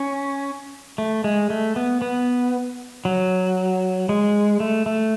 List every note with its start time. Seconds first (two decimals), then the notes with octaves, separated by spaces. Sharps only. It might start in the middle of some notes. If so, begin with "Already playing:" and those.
Already playing: C#4
0.98 A3
1.24 G#3
1.50 A3
1.76 B3
2.02 B3
3.05 F#3
4.09 G#3
4.60 A3
4.86 A3